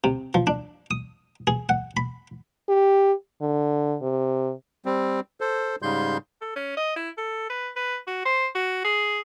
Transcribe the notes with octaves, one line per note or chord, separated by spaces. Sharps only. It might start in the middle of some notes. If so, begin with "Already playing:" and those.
C3
F3
D4
D#6
G#4
F#5
B5
G4
D3
C3
G3 C4
A4 C5
G#2 C#3 G3 C6 G6
A4
C#4
D#5
E4
A4
B4
B4
F#4
C5
F#4
G#4